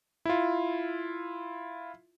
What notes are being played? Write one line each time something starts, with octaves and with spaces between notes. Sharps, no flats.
E4 F4